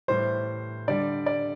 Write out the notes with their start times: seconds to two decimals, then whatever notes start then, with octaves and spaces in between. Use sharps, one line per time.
0.08 A2 E3 G3 C5
0.88 D3 G3 D5
1.26 D5